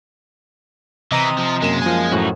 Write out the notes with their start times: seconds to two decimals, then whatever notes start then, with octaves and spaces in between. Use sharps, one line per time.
1.12 C3 E3 D#5 A#5 D#6
1.38 F3
1.62 F#2 G#3 A#3 E7
1.82 F3 G#5
2.12 F#2 A2 D#4 F#4